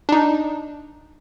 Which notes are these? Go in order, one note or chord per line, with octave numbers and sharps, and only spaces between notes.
D4 D#4